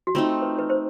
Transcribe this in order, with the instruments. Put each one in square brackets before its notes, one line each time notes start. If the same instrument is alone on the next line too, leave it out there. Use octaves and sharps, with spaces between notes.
[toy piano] F#4
[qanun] A3 C4 D#4 [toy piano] F4
[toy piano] B4
B4
C5